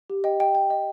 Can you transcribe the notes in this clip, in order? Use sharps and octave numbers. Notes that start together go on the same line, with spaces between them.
G4
D#5 G5
D#5 G5
G5
D#5